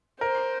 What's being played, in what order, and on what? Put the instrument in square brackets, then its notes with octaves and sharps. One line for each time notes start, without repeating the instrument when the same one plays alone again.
[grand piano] A#4 [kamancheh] C5